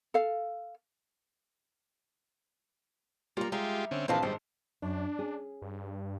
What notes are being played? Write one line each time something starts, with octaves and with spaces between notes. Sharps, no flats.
A4 F5
G3 A#3 F4 A#5
G#3 F4 G4 E5 A#5
D3 C4 C#4
A#1 E3 F3 A#3 C4 B4 F5 A5
G#1 G3 C5
F#2 D4
C#4 G#4
G2